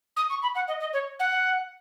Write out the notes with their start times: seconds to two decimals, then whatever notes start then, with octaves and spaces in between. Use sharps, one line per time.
0.16 D#6
0.30 C#6
0.42 B5
0.55 F#5
0.68 D#5
0.80 D#5
0.93 C#5
1.19 F#5